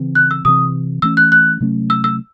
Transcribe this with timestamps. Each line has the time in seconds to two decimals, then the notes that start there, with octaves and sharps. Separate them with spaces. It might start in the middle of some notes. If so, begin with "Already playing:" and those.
Already playing: C#3 E3 C4
0.15 F#6
0.31 E6
0.45 C3 E3 C4 D#6
1.02 E3 A3 C#4 E6
1.17 F#6
1.32 F#6
1.61 C3 F#3 A3 C#4
1.90 E6
2.04 E6